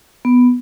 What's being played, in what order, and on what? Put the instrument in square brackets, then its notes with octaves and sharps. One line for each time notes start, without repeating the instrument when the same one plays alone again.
[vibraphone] B3